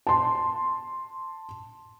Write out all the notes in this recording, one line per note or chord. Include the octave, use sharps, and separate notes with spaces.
A5 C6